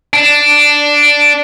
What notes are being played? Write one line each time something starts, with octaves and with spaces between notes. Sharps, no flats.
D4